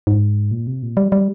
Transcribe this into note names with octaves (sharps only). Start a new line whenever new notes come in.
G#2
A#2
C3
A#2
G3
G3